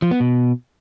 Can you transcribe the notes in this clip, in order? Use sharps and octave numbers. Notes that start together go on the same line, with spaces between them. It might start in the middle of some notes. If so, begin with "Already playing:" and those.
F3
B3
B2